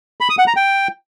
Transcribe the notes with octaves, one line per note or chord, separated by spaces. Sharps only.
B5
D#6
F#5
A#5
G5